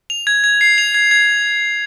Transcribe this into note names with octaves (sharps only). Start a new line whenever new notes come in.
F7
G#6
G#6
C7
F7
G#6
G#6